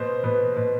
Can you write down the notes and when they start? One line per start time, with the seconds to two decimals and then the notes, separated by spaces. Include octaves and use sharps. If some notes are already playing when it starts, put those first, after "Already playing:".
Already playing: B2 C5
0.24 B2 B4
0.56 B2